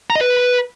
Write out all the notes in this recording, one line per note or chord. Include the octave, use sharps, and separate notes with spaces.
A#5
D#5
B4